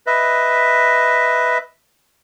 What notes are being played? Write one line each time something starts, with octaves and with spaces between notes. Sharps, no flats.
B4 D#5 E5